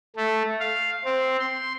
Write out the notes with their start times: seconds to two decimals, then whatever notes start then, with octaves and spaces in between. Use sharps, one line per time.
0.16 A3
0.60 F5
1.04 C4
1.39 C6